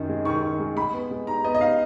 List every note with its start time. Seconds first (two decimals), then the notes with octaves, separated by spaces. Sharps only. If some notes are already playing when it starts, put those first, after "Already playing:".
Already playing: F#2 D#3
0.09 G#3
0.25 D#3 C#6
0.43 D#3
0.60 G#3
0.77 G#3 B5
0.94 B3
1.11 G#3
1.27 D#4 A#5
1.44 B3 D#5
1.55 D#5
1.60 D#4 F5